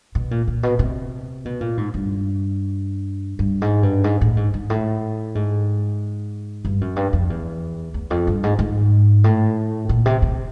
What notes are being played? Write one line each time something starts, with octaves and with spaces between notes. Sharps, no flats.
B2
A#2
A#2
B2
C3
B2
A#2
G#2
G2
G2
G#2
G2
G#2
A2
G#2
G#2
A2
G#2
G2
F#2
G2
F2
E2
E2
F2
G2
G#2
G#2
A2
A#2
C3
C3